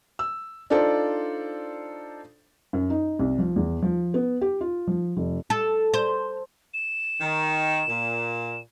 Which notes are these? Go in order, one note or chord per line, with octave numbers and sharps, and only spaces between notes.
E6
D4 D#4 F4 A4 C5 D5
F#2
D#4
C2
F3
E2
F3
B3
G4
F4
F3
F1
A4
C5
E7
D#3
A#2